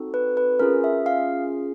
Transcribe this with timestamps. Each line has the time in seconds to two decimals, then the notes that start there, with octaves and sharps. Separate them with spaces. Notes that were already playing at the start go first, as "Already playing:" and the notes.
Already playing: C4 D#4 F#4 A4
0.14 B4
0.37 B4
0.60 C#4 F4 G#4 A#4
0.84 E5
1.06 F5